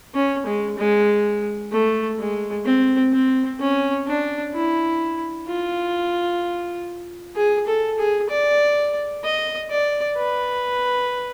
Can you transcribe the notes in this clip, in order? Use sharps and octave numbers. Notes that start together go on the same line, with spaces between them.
C#4
G#3
G#3
A3
G#3
C4
C4
C#4
D4
E4
F4
G#4
A4
G#4
D5
D#5
D5
B4